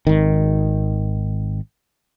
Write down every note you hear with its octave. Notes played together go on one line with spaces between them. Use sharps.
G#1 D#3